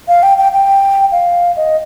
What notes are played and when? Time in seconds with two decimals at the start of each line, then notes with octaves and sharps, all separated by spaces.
0.08 F5
0.23 G5
0.38 G5
0.52 G5
1.12 F5
1.56 D#5